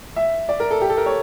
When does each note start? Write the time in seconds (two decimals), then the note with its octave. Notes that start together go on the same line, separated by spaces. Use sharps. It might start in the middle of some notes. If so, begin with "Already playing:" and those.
0.16 E5
0.49 D5
0.60 A#4
0.71 A4
0.82 G4
0.90 A4
0.97 A#4
1.06 C#5